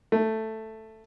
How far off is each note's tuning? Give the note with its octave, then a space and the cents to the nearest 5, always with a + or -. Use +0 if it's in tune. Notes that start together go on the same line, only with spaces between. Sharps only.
A3 +5